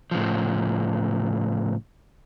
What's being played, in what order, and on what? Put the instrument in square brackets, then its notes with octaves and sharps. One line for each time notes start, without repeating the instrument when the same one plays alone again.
[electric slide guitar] A2 C#3 F3